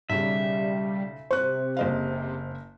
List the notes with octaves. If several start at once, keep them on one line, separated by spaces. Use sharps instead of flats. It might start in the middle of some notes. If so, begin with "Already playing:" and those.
B1 C#3 G3 E5
C3 C5 C#6 F#6
F#1 D#5 F5